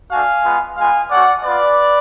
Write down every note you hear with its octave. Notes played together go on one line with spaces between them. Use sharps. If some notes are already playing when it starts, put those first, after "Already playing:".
A3 D4 F#4 F5 G#5
G#3 B3 F4
G#3 B3 F4 F5 G#5
A3 C#4 F#4 D5 F#5
B3 F4 B4 D5